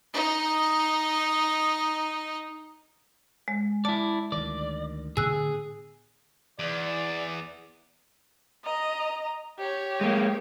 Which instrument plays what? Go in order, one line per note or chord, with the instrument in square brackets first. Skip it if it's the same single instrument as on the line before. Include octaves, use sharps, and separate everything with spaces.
[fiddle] D#4 D#5
[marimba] G#3
[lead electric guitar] E4 D5 [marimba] A5
[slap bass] D2 D#3 [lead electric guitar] D5
[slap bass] A2 D3 B3 [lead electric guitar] G#4 [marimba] E6 F#6
[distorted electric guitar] E2 [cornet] D5
[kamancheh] D#5 A#5
G4 C#5
[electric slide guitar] G#3 A#3